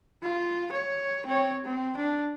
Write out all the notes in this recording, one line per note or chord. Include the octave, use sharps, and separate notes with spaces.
F4
C#5
C4 C#5
C4
D4